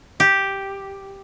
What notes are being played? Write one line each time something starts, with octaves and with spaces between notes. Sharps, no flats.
G4